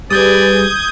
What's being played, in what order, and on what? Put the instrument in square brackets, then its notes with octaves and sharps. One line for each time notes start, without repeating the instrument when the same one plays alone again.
[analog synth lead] G3 [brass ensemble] G#4 B4 [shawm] D5 [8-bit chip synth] D#6 G6 G#6